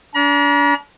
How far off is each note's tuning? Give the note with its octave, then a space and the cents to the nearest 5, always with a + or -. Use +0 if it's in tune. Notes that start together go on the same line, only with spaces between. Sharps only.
D4 -35 A#5 +40